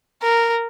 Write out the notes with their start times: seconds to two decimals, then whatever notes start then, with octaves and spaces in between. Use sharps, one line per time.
0.23 A#4